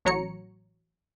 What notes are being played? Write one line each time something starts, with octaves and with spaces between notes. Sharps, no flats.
A1 F#3 C#5 A#5 C#7